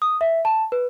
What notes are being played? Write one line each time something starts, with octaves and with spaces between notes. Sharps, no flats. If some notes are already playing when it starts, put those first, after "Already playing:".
D#6
E5
A5
B4